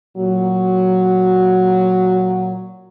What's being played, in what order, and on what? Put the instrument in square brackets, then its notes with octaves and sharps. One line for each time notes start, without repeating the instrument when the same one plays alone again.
[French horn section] A#2 F#3